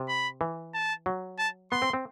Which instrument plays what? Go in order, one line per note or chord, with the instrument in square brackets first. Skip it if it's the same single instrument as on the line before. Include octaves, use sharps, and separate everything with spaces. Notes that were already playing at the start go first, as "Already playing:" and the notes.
Already playing: [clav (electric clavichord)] C3
[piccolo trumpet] B5
[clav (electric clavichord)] E3
[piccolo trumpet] A5
[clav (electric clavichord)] F#3
[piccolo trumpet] A5
[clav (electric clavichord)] B3 [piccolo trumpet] C6
[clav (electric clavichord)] C4
C4